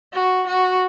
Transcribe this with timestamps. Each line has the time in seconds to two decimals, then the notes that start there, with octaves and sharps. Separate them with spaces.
0.13 F#4
0.47 F#4